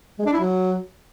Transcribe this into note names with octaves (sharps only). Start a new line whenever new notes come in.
G#3
D4
E4
F#3